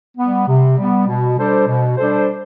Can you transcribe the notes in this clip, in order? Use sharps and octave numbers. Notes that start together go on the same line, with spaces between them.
G3 B3
C3
G3
B3
B2
G3 D4 A4 C5
B2
G3 D4 A4 C5